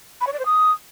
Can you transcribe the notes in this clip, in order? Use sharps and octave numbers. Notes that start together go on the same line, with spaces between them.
B5
C#5
D5
C5
D#6